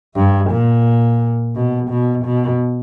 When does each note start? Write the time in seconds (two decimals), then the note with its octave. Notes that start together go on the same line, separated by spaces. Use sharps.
0.15 G2
0.51 A#2
1.55 B2
1.90 B2
2.25 B2